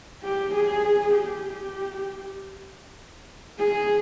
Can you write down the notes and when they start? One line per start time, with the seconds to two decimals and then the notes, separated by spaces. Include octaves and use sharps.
0.24 G4
0.55 G#4
1.15 G4
3.59 G#4